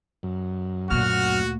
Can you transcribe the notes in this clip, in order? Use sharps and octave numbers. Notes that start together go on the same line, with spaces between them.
F#2
D2 A#2 F#4 F6